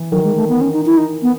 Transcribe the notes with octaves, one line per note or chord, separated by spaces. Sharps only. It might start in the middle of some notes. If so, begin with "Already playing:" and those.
Already playing: E3
D#3 F#3
G#3
A3
B3
C#4
D#4
E4
D#4
B3